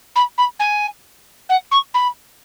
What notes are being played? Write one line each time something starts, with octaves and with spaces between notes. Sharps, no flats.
B5
B5
G#5
F#5
C#6
B5